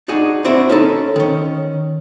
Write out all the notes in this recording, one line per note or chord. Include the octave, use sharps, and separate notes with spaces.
D4 D#4 F#4 G#4
C4 D4 E4 F#4 D5
C#4 D#4 A4
D#3 C#4